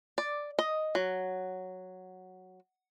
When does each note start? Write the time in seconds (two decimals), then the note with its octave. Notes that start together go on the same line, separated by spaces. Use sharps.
0.18 D5
0.59 D#5
0.95 F#3